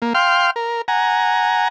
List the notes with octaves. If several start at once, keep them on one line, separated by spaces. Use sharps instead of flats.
A#3
F5 G5 C6 F6
A#4
F#5 G#5 A#5